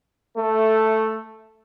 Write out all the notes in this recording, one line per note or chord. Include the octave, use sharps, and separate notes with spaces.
A3 A4